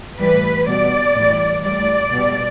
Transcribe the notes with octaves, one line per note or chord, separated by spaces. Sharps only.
A2 E3 G3 B4
B2 G3 D5
A2 E3 G3
A2 G3 D5
B2 G3